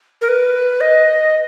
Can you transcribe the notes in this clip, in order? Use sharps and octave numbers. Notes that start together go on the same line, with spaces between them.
A#4
B4
D#5